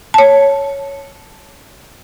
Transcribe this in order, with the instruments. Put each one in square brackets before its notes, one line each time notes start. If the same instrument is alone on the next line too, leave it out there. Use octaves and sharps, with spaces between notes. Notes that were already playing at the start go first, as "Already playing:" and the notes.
[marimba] C#5 A5